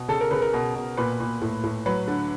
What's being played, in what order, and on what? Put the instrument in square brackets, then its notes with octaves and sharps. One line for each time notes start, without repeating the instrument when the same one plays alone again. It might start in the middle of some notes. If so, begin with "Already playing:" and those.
Already playing: [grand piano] B2
C#3 A4
A#4
C#3 B4
A#4
B2
B2
A#2 B4
A#2
A2
A2
F#3 B4
D3